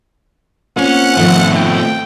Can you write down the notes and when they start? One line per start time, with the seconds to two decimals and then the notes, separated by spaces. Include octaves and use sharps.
0.78 A#3 C4 C#4 F4 C5 F#5
1.17 G#2 B2 D#3 F3 A3
1.56 G5